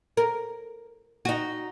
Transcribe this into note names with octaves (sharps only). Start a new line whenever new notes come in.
A#4
D#4 F#4